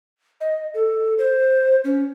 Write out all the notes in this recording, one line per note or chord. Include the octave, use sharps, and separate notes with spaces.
D#5
A4
C5
C#4